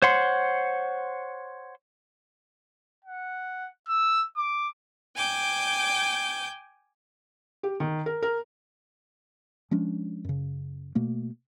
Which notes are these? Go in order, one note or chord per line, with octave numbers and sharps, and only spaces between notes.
C5 C#5 F#5 C6
F#5
E6
D6
G5 G#5 D6 G6
G4
D#3
A#4
A#4
F3 G#3 C#4 D4
F#2 C#3
B2 A3 A#3